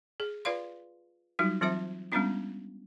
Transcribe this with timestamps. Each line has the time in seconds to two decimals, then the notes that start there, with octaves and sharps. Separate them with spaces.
0.20 G#4
0.45 F4 B4 D5 F5 C6
1.39 F#3 G3 D#4 F4 F#4
1.61 E3 F#3 C4 F4 C5 E5
2.12 G3 G#3 B3 C#4 D4 F4